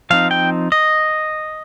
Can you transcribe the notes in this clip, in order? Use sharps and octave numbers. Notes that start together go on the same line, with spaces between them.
F3 C4 D#4 F5
G5
D#5